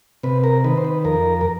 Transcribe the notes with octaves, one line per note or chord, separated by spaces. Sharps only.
C3 B4
A#4
D#3 B4
C5
B4
F2 A#4
A#4